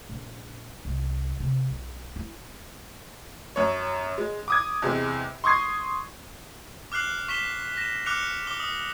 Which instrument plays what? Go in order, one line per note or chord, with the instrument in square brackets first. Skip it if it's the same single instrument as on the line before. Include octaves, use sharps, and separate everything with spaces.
[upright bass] A#1
C2
C3
B1
E4
[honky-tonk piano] F#2 C#5
G#3
D6 D#6 G#6
E2 C3 G#3
C6 C#6 D#6 G#6 C7
[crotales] D6 F6 F#6 C7 F#7
C#6 B6 E7 G7
A#6 E7
D6 F6 F#6 C#7 F7
D6 G7
D#6